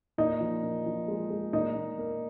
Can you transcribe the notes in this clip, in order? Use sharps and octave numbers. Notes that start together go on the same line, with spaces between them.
A#2 D#4
F3
A#2
F3
G#3
G#3
A#2 D#4
A#2
A#3